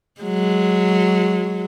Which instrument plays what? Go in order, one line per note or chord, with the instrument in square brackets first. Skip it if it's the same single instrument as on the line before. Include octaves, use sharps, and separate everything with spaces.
[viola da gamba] F#3 G#3